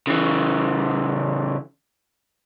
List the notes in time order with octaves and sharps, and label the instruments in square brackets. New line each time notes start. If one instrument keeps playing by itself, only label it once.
[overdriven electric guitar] C#3 E3